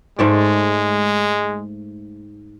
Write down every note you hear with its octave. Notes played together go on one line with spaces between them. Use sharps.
G#2 G#3 A3 D5